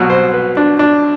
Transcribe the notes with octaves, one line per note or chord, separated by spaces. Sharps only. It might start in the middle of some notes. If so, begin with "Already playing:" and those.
Already playing: C2 B2 F#3
C5
B4
D4
D4